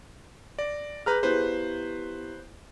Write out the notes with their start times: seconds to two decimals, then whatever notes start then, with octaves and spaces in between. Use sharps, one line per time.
0.59 D5 A#6
1.06 G#4 B4 A#5 F6 G6
1.23 B3 E4 G4 B4 C5